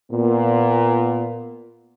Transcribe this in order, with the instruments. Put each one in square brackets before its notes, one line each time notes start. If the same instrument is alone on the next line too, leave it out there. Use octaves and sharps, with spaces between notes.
[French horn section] A#2 B3